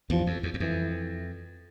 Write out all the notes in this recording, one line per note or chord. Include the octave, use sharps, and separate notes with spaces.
E2 G2 F3
F2
E2
E2
F2 E3